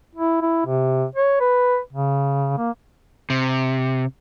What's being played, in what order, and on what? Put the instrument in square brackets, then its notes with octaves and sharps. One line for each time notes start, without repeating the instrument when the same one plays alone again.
[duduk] E4
E4
C3
C#5
B4
C#3
A#3
[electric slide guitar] C3